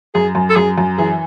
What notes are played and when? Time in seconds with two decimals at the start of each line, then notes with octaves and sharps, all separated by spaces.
0.15 F#2 G#4
0.35 F#2
0.50 A4
0.56 F#2 G#4
0.78 F#2
0.98 E3 G#4